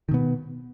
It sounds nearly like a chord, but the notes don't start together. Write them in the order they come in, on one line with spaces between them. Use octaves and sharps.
D#3 B2 B3